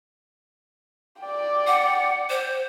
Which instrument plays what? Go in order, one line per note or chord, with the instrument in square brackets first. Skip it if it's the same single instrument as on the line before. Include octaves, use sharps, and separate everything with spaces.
[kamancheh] D5 G5
[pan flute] F#5
C5